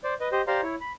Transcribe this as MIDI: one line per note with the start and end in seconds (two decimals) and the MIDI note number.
0.04 0.14 72
0.04 0.14 74
0.20 0.29 71
0.20 0.29 75
0.32 0.42 67
0.32 0.42 72
0.32 0.42 75
0.47 0.61 67
0.47 0.61 72
0.47 0.61 74
0.47 0.61 77
0.47 0.61 82
0.47 0.61 84
0.63 0.75 64
0.63 0.75 73
0.80 0.92 83